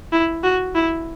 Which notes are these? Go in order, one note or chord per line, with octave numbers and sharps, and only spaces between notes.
E4
F#4
E4